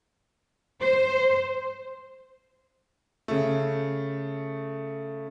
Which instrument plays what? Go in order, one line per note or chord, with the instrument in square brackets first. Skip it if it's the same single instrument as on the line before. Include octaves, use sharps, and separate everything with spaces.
[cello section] C5
[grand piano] C#3 A3